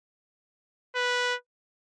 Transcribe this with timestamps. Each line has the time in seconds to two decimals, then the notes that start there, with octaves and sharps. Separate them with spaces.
0.95 B4